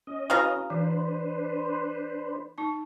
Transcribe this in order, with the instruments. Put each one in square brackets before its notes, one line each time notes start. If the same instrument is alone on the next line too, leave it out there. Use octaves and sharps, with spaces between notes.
[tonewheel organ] C#4 D#5
[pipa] C#3 F5 A#5 [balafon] E4 F#4 B4
[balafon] E3 [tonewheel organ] D4 B4 C5
[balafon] D#4 A5